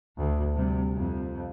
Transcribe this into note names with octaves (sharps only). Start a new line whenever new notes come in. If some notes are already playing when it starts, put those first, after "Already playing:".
D2
C3 G3
F2